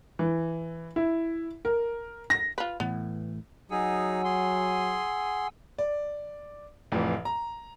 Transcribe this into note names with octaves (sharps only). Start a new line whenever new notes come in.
E3
E4
A#4
A#6
F4 B4
A2 E3 B3
F#3 D#4 G#4 F#5 G#5 E6
G#4 C6
D5
F1 F2 A2 E3
A#5